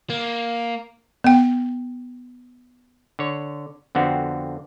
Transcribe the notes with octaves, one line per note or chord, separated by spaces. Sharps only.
A#3
B3 G5
D3 C#5
F2 D3 B3 C4 F#4